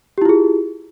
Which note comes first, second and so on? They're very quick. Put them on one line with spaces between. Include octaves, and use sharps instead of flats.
G4 E4 F4 G#4